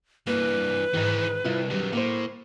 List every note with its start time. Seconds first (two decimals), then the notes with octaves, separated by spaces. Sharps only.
0.27 G2 E3 A#3 B4
0.94 G#2 D#3 E3 D#4
1.45 C2 E4 F4
1.71 F#2 D#3 G3
1.93 A2 A#3 C5